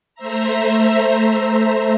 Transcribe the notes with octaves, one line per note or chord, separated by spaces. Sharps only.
A3 C5 E5 A#5